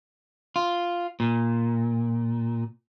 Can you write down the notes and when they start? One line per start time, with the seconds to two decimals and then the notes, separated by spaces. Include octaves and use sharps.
0.56 F4
1.20 A#2